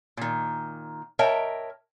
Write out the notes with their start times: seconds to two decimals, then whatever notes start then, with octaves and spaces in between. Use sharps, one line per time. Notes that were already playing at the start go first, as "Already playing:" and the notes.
0.17 A#2 D#3
1.19 A#4 C#5 D#5 E5 G5 A5